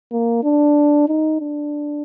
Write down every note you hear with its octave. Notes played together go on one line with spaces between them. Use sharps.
A#3
D4
D#4
D4